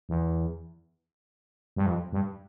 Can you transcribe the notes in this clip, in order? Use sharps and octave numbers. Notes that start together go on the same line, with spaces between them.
E2
G2
F2
G2